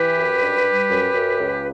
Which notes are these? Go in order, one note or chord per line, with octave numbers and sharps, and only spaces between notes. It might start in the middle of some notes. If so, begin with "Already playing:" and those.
Already playing: E3 G4 B4
F#2
G2
G3
F#2
F#2
C#2